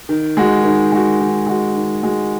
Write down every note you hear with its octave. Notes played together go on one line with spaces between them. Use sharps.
D#3
G#3 F#4
D#3
G#3 F#4
D#3
G#3 F#4
D#3
G#3 F#4